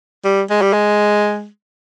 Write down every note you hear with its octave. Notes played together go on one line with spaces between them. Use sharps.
G3
G#3
G3
G#3